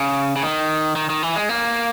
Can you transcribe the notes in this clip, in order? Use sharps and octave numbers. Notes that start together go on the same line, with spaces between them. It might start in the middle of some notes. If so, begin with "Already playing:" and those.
Already playing: C#3
C#3
D#3
D#3
D#3
E3
G#3
A#3